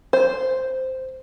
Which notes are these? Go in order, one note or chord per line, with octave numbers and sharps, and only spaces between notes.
C5